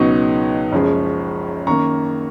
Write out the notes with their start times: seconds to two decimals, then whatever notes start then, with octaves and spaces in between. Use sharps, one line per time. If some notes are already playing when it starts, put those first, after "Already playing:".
Already playing: C#2 B2 F#3 B3 D#4 C#6
0.72 F#1 F#2 F3 G#3
1.66 F#2 D#3 A#3 A#5 C#6